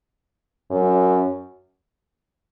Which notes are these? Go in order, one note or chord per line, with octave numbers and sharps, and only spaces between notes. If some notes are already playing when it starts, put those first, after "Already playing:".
F#2